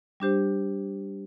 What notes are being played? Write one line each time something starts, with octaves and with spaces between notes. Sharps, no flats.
G3 D4 G4 C5